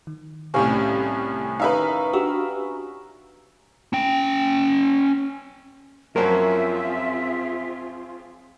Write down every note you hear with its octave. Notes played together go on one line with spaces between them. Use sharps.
D#3
C2 A2 C3 C#4 F5
D#4 A#4 B4 E5 F5
D4 F#4 G4 E6
C#4 G5
F#2 F3 F#3 C4 F4 G#4 A#4 E5